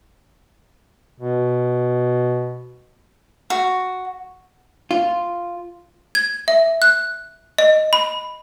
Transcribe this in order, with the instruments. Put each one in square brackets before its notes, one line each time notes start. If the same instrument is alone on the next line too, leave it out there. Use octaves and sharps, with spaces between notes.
[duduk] B2
[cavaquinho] F#4
[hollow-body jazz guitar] F4
[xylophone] G#6
E5
F#6
D#5
B5